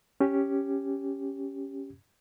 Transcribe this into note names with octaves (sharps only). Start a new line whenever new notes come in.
C#4 G4